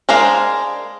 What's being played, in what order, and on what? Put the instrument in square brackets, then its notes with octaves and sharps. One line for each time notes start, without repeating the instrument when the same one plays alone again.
[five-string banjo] G#3 D4 A#4 C5 F5